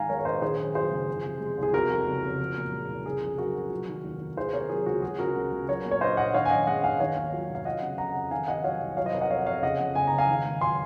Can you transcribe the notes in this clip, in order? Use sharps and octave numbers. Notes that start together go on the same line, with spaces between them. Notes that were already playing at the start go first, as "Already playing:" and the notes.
Already playing: G#2 D#3 F5 F#5 G#5 A#5
G#3 A#4 C#5
C#5
A#1 C5 D#5
D#3 G#4 C5
F#2
F#3 G#4 C5
F#1
F3
C3
G#3
C2 G#4
C3 F#4 A#4
F2
F#1
F#1
F3
A#2
G#3
C2
C#3 G#4
F2
F#3 F#4 A#4
F1
F#3
D#3
D#2
D#2
D#3 G#4 C5
C3 A#4 C#5
F#3 G#4
C#2 F#4
G#3 G#4
C#3 F#4 A#4
C#2
C#2
F#3 A#4 C#5
A#2
C#5
A#1 C5 D#5
A#1 D#5 F#5
D#3 C#5 F5
G#5
F#2 D#5 F#5
G#3 D#5 F#5
G#1 F5 G#5
D#3 C#5 F5
D#2
F#3
F1
F5
F#3 D#5 F#5
C#3
F2 F#5 A#5
F2
D#3 F5 G#5
C3 D#5 F#5
F#3 C#5 F5
C2
F#3 C#5 F5
C5 D#5
C3 A#4 C#5
D#5 F#5
F2 C#5 F5
F2 C#5 F5
C#3 D#5 F#5
F2
F#1 G#5
A#5
F#1
F5 G#5
D#3
G#2
F#3 G#5 C6